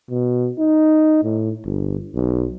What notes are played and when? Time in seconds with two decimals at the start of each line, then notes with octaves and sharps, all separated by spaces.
0.10 B2
0.59 D#4
1.23 A2
1.65 G1
2.15 B1